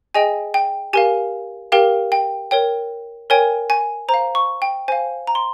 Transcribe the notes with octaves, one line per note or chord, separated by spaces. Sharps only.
G#4 D#5 G5 G#5
G5
G4 A#4 F5 G#5
G4 A#4 F5 G5
G5
A#4 C#5 G5
A#4 C#5 G5 G#5
G#5
C5 A#5
F5
C#6
G5
C5 F5 G#5
A#5
C6